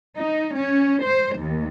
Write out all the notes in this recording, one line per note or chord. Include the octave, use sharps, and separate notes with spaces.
D#4
C#4
C5
D#2